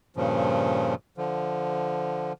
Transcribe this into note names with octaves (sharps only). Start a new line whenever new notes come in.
G2 A#2 C#3 F3
D3 F3